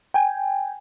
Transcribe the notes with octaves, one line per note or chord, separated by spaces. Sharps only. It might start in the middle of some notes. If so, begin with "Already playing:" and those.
G5 G#5